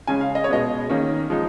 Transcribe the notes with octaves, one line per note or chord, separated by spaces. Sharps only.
C#3 G#3 C#4 G#5
F5
D#5
C#5
B2 G#3 B3 D#5
D#3 A#3 C#4
F3 G#3 D#4